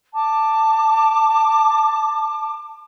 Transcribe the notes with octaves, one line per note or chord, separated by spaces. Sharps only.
A5 D6